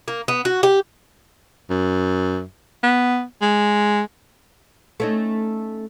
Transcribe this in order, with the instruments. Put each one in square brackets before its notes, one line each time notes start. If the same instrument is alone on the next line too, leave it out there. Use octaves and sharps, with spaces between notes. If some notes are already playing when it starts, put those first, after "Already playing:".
[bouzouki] A#3
B3
F#4
G4
[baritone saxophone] F#2
B3
G#3
[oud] A3 C#4 D#4